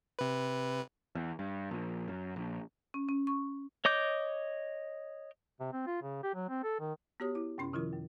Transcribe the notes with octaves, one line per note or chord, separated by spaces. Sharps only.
C3 B4
E2
G2
A#1
F#2
A#1
C#4
C#4
C#6
C#5 D#5 D6 G6
C3
C4
F4
C#3
G4
F#3
C4
A4
D#3
B3 F#4 G4 C#5 D#6
E4
F#2 C3 C#4 C6
C3 D#3 F3 E4 F4 A#4
F#2